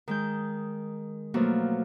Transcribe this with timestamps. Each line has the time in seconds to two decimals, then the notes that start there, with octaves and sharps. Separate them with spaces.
0.08 D#3 G#3 G6
1.34 B2 F3 F#3 A3 A#3 F#4